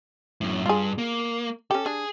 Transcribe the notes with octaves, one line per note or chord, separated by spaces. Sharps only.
F#2 A2
G2 F4 G#4
A#3
C#4 G4 A4
D4 G#4